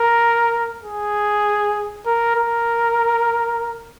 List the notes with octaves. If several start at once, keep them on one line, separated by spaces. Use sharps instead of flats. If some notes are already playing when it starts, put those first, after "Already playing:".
Already playing: A#4
G#4
A#4
A#4